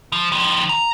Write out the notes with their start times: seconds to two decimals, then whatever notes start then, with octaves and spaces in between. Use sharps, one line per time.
0.12 F3
0.32 D#3 F3
0.69 A#5